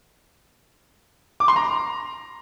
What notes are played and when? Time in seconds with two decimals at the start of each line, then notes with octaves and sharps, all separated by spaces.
1.40 D6
1.48 C6
1.56 A#5